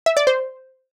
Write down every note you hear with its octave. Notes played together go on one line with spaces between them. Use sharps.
E5
D5
C5